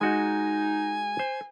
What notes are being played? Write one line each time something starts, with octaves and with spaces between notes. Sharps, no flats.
G#3 D#4 F#4 D#5 G#5
C5